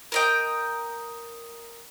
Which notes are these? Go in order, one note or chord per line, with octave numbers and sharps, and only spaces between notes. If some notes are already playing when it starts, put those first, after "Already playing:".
A#4 D#5 G5